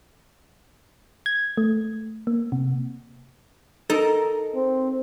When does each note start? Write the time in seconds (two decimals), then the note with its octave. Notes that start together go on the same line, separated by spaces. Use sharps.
1.26 G#6
1.57 A3
2.27 A#3
2.52 C3
3.90 D#4 A4 A#4
4.55 C4